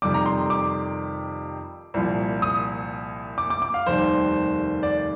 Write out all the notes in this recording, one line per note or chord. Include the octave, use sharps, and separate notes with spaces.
F2 C3 D#3 G3 D6
A#5
C6
D6
C2 A#2 F3
D#6
D6
D6
D6
F5
F1 D#2 D#3 G3 C5
D5